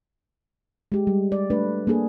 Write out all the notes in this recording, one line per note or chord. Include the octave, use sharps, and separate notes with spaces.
G#3 G4
G3
D5
A3 D4 B4
A#3 D4 G#4 A4